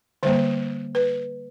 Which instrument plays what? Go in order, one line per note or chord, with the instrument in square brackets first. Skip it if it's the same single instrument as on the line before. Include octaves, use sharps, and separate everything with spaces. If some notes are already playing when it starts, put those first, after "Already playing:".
[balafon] D3 G3 A#3 C5
B4